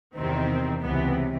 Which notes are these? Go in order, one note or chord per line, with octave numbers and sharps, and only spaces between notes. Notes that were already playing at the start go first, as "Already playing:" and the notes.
E2 C3 D#3 C4
C#2 C3 E3 B3